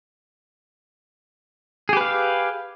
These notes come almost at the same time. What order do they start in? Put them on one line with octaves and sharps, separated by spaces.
G#4 G4 B4 F5